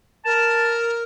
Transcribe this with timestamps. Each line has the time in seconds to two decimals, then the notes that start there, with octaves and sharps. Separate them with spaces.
0.25 A#4 A5